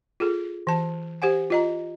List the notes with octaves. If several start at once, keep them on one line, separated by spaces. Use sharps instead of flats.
F4 G#4 A4
E3 A5
G4 C5 F#5 G#5
F4 D#5 A#5